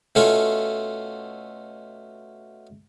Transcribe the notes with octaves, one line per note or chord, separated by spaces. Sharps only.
B2 A3 C#4 F4 A4 C#6